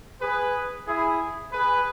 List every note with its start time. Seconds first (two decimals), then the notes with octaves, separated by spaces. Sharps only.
0.20 G#4 B4
0.86 E4 G#4
1.52 G#4 B4